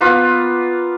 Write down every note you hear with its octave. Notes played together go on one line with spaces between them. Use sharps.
A#3 B3 F4